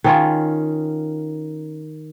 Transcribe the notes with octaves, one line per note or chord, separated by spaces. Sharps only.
D#3 C#4 F4